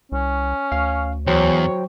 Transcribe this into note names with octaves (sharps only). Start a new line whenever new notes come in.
C2 C#4
D2 F5
E2 F#3 C5 C#5 G5